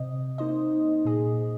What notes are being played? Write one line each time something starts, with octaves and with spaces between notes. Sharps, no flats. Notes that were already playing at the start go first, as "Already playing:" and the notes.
Already playing: C3 C4 D#5
A#3 D#4 C5 D#5
A#2 A#3 G#4 D#5